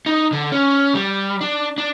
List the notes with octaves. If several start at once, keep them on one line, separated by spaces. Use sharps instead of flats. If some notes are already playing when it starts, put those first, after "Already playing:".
D#4
D3
C#4
G3
D4
D4